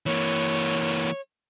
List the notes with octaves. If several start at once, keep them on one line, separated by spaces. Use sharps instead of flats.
E3 A#3 C#5